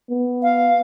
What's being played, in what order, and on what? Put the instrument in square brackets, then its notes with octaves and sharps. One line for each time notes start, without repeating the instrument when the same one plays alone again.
[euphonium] B3
[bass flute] F5